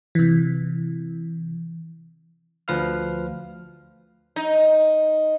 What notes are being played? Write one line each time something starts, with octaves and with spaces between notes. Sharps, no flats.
C3 E3
D2 F3 B4 F5 F6
D#4